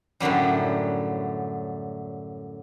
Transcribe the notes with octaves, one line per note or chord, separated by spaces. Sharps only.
F#2 A2 D3 F#3 G3